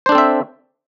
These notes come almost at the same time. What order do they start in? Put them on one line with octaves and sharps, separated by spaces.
C5 D4 A4 C4 E5